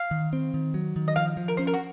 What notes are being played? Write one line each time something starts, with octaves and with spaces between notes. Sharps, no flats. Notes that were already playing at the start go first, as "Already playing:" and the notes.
Already playing: F5
D#3
C4
D#3
F#3
D#3
D#5
F3 F5
F3
A#4
C#4 C5
A#4
F#4